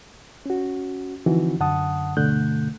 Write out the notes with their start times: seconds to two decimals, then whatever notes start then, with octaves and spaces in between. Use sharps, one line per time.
0.46 C#4 F#4
1.26 D3 E3 F3 C4 D#4 F#4
1.60 F#2 D3 F#5 A5 D#6
2.17 G2 B2 D3 A3 F#6 G6